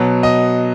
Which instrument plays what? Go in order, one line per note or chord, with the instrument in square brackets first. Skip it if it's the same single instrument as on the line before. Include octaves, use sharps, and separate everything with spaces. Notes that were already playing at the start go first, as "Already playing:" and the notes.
Already playing: [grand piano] B2 F#3
D#5